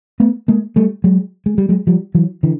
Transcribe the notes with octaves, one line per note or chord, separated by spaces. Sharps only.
A3 B3
G#3 A#3
G3 A3
F#3 G#3
G#3
G3
F#3 G#3
F3 G3
E3 F#3
D3 E3